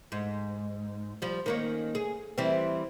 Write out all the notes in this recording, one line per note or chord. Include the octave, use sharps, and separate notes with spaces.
G#2
F3 G3
D#3 A#3 C#4
G#4
E3 G3 C4